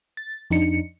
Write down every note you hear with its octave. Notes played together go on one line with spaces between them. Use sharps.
A6
F2 D4 D#4 C#7